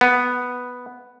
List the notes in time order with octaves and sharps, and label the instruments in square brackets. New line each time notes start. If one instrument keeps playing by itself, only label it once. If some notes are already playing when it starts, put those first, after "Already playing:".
[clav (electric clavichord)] B3